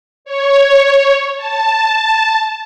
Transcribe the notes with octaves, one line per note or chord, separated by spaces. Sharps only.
C#5
A5